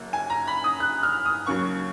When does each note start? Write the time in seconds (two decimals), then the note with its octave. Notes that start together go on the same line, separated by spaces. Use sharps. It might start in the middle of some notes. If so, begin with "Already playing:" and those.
Already playing: F#1 F#2
0.13 G#5
0.30 A#5
0.47 B5
0.64 D#6
0.80 F#6
1.03 F6
1.25 D#6
1.47 D#2 C#3 F#3 C#6